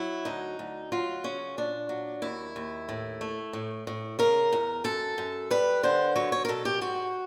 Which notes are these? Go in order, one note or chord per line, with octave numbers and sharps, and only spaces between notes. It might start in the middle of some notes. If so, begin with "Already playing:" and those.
Already playing: F#3 E4
D2 D#4
D2
F#3 F4
C#3 C#4
A#2 D4
F#3
D#2 E4
D#2
A2
A3
A2
A2
C#3 A#4
E2
F#2 A4
F#2
G3 B4
D3 C5
F#3 C#5
C#5
A#4
B2 A4
G4
G#2 F#4